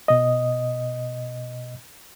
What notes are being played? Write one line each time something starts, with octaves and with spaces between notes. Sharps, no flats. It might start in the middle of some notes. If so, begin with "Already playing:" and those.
B2 D#5